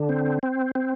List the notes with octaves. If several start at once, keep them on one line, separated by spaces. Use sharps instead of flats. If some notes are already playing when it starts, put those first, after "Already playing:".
Already playing: D3
C4
C4
C4